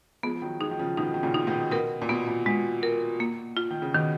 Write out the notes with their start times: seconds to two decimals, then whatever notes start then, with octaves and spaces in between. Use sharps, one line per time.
0.23 F3 G#3 B3
0.35 F3
0.42 D#3 F#3
0.60 F3 G#3 D#4
0.71 D#3
0.79 C#3 F3
0.98 B2 D#3 D#4
1.14 D#3
1.23 A#2 C#3
1.34 D#4
1.47 B2 D#3
1.71 B2 A#4
2.02 A#2
2.09 B2 B3
2.28 A#2
2.46 B2 G#3
2.83 A#4
3.20 A#3
3.57 F4
3.71 D#3
3.82 C#3
3.94 B2 D#3